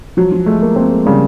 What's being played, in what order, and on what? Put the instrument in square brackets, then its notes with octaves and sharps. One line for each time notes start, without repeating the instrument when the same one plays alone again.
[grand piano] F3 [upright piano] F#3
[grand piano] F3
[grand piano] G#3 [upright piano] A3
[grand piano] A#3
[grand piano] A#3 [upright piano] C4
[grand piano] G#3
[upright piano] C#3 [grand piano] G3